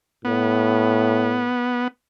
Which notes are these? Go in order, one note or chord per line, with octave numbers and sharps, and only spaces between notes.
A2 B3